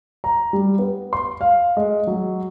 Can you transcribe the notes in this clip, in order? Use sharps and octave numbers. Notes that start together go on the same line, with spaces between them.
A#5
G3
B3
C6
F5
G#3
F#3